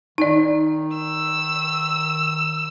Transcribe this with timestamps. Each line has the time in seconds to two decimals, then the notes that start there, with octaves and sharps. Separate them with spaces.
0.18 D#3 D#4 D5
0.97 E6